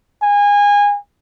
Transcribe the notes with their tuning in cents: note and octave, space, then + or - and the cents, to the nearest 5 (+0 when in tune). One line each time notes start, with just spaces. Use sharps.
G#5 -25